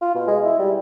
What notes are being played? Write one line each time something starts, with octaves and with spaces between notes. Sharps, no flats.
F4
B2
G#3
E4
G3